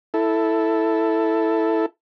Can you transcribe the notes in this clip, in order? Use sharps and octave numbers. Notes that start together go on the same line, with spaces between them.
E4 A4